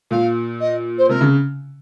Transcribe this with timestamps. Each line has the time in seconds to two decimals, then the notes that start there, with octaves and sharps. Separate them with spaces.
0.11 A#2 F5
0.60 D#5
0.98 C5
1.09 C3 A#4
1.21 C#3